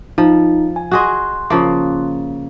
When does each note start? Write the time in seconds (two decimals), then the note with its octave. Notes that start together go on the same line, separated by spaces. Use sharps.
0.18 F3 D#4
0.76 G#5
0.91 F#4 G#4 D#5 C6 F#6
1.50 C#3 F3 A#3